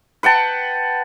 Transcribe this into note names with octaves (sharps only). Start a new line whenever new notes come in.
B4 F#5 G5 A5